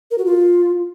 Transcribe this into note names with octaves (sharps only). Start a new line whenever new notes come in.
A#4
F#4
F4